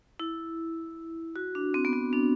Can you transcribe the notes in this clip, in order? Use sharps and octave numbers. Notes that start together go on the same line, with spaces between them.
E4
F#4
D4
C4
B3
C4
D4